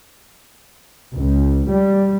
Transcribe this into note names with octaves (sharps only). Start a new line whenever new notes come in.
C#2
G3